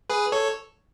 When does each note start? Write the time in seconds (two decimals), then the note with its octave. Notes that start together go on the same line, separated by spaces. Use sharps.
0.10 G#4 B4
0.32 A4 C#5